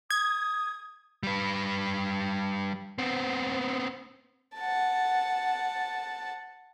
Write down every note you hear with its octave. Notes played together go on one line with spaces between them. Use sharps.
D#6 G#6
G3 B4
B3 C4
F#5 A5